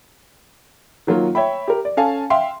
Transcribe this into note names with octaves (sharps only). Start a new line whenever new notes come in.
D#3 F#3 A#3 F4
C#5 E5 G5 B5
G4 A#4
D5
C#4 A4 F5 G#5 A5
E5 F5 G5 C6